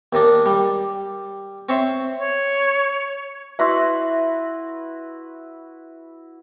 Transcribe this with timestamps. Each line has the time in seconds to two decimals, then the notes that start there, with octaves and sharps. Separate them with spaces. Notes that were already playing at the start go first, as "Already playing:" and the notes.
0.13 D#2 D#3 D4
0.46 G3
1.69 C4 C#5 E5 C6
2.18 C#5
3.59 E4 F#4 B4 E5 C6